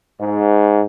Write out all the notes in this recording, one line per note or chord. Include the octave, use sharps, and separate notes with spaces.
G#2